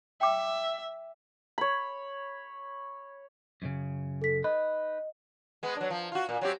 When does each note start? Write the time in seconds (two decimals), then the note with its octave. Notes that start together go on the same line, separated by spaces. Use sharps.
0.21 E5 G5 D6
1.58 C#5 B5
3.62 F#2 A#2 C#3
4.22 A4 B6
4.44 D#4 B4 D#5
5.63 G#3 B3
5.76 F#3 D4
5.90 F3
6.12 F4 F#4
6.29 A#2
6.41 F#3 C4 G4